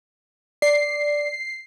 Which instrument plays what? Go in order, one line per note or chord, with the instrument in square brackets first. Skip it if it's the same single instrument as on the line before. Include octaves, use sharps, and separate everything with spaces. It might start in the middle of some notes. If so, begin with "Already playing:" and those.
[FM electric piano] D5 [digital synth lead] C7